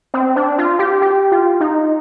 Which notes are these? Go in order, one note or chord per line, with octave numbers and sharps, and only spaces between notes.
C4
D4
F4
G4
G4
F4
D#4